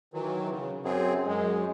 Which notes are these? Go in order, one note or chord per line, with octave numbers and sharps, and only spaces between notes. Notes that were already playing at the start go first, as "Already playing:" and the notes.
D#3 E3 F#3
C#3
F#2 C4 G#4
F#2 G#3